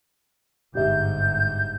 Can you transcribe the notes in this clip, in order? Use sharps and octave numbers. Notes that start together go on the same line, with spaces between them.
G1 G#2 G4 E5 G6